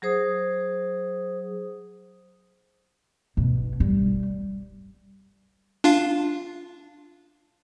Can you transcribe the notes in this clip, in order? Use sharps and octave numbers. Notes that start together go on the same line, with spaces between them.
F#3 G#4 C5 D#6
B2
G3
D4 F4 F5